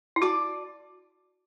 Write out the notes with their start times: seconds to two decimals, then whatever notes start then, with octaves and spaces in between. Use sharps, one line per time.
0.16 E4
0.22 F#4 D5 A5 D6